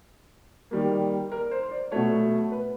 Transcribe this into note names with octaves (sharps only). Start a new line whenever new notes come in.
D#3 G3 A#3
A#4
C5
D5
B2 F#3 A3 C#5
B4